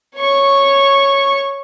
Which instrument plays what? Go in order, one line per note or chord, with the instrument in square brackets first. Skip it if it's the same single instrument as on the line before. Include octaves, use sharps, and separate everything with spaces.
[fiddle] C#5 C#6